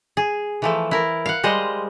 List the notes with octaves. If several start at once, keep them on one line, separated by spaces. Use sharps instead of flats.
G#4
E3 F3 A3
E4 A#4
F5 F#5
G3 G#3 C5 D#5